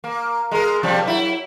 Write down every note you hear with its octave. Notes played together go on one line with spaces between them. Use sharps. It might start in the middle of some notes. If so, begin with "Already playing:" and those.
A#3
G#3 A#4
C3 F3 G3
F#3 E4